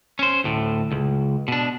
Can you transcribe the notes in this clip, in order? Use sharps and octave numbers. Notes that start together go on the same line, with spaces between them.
C#4 C5
D2 A2
C#2
B2 D4